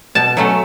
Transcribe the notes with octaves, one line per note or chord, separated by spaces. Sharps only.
B2 A5
F#3 A3 C#4